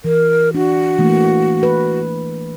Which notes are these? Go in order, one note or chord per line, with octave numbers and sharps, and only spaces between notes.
E3 A#4
D4 F#4
E3 A3 A#3
B4